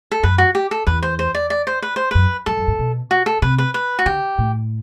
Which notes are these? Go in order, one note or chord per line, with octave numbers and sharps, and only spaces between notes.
A4
F#2 B4
F#4
G4
A4
E2 B4
C5
C5
D5
D5
C5
B4
C5
F#2 B4
F#2 A4
F#2
G2
B2
F#4
A4
C3 B4
B4
B4
F#4
D3 G4
A2